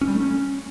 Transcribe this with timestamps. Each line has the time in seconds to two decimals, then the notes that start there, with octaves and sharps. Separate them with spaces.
0.01 C#4
0.08 G3
0.14 A3
0.20 C#4